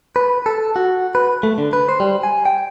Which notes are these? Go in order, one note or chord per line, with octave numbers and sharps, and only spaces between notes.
B4
A4
F#4
B4
A3
D3
B4
C5
G3
G#5
G5